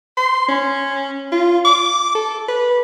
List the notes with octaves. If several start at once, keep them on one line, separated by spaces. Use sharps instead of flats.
C6
C#4
F4
D6
A4
B4